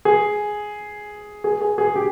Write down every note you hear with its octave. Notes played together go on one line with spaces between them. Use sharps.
G#4
G#4
G#4
G#4
G4